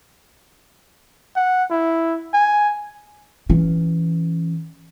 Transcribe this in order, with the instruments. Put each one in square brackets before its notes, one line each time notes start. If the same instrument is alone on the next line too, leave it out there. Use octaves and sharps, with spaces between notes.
[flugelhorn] F#5
E4
G#5
[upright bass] E3 C#4